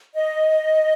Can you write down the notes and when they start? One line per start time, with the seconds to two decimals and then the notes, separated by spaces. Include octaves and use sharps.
0.14 D#5